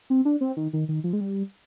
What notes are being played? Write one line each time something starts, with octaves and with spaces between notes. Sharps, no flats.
C4
D4
C4
D#3
D#3
D#3
F3
G#3
G3